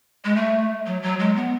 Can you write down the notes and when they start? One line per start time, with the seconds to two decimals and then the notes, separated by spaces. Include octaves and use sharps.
0.24 G#3
0.36 A3
0.86 F#3
1.02 F#3
1.19 G#3
1.36 B3